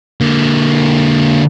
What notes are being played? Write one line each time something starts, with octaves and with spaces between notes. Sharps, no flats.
D3 A#3